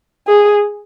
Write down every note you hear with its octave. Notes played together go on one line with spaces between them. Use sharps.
G#4